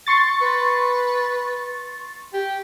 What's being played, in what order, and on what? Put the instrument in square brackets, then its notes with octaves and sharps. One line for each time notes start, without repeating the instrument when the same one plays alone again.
[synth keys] C6 C#6 A6
[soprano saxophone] B4
G4